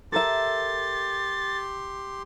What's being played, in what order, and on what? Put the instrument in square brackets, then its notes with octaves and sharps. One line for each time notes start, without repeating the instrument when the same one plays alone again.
[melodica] G4 C6 [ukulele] A4 A#4 E5 [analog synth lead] A6